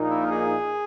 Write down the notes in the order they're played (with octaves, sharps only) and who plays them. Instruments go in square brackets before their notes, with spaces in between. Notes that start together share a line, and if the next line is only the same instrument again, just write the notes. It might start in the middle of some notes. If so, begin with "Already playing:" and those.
Already playing: [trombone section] A#1 A#2 A#3 D#4
[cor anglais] E4
A#4
G#4